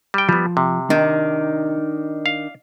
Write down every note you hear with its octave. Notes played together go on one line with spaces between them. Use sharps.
G3 G5
F3 G3 B3
C3
D#3 D4 D#4
F5